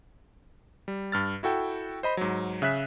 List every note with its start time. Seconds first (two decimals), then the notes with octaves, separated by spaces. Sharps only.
0.88 G3
1.12 G2 F6 A6
1.43 E4 F#4 A4 G5
2.03 C5 D#5 B5
2.17 G#2 F#3
2.62 C#3 E5 F#6 B6